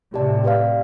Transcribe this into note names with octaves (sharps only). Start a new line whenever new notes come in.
A2 C3 G4 D5 A5
G4 B4 D5 F5